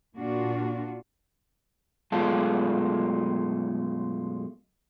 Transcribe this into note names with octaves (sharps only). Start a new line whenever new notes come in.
A#2 D4 F4 F#4
F#2 B2 G#3 A3 F4 A5